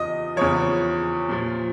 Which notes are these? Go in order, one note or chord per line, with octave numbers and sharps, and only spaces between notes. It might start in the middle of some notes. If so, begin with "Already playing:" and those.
Already playing: E2 C#3 F3 D#5
E2 C#3 F3 C#5
A#2 F3